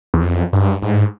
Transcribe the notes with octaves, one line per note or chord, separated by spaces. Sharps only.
E2
F2
G2
G#2